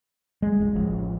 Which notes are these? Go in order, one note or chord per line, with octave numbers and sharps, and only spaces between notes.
G#3
F#1 C#2
A1 F3 C#4